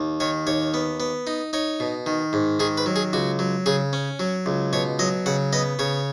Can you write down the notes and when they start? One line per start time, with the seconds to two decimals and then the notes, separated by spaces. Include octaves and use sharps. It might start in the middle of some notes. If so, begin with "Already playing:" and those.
Already playing: D#2
0.20 D#3 C#5
0.47 D#2 C#5
0.74 B3
1.00 B3
1.27 D#4
1.53 D#4 C#5
1.80 B2
2.06 D#3
2.33 G#2
2.60 D#3 G#4
2.77 B4
2.86 F#3
2.96 G#4
3.13 C#2 F#4
3.39 F#3
3.66 C#3 G#4
3.93 C#4
4.19 F#3
4.46 C#2
4.73 B2 C#5
4.99 F#3 D#5
5.26 C#3 F#5
5.53 B3 D#5
5.79 C#3 C#5